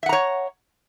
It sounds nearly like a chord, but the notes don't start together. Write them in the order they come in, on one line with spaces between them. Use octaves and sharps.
E5 F#5 A#5 C#5